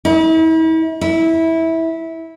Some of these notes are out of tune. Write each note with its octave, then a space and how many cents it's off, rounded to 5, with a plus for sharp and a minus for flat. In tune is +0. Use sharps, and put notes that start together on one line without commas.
E4 -40
E4 -15